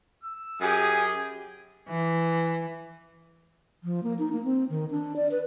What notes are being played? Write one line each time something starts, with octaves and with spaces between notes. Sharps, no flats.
E6
F#2 G4 G#4 G#5
E3
F3
A#3
D#4
A#3
C4
D#3
D4
D5
B4